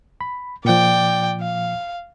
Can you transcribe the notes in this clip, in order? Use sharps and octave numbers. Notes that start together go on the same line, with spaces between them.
B5
A#2 F3 D5 G5
F5